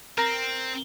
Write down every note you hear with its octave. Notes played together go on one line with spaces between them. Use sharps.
C4 A#4 A#5